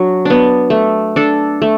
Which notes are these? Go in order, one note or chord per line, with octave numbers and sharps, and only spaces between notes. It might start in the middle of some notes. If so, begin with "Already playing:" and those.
Already playing: F#3 D4
B3 D4
A3
D4 A4
A3